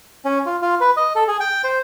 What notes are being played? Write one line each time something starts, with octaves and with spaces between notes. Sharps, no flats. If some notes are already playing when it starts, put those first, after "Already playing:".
C#4
F4
F4
B4
D#5
A4
G#4
G5
C5